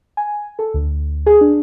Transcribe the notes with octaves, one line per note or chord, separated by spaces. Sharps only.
G#5
A4
D2
G#4
D4